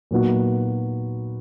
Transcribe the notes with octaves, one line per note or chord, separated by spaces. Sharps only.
A#2 F#3 B3 D#4 F#4